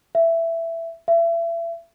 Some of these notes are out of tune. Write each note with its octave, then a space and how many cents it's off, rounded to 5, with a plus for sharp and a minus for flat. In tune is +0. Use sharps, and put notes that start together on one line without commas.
E5 +10
E5 +35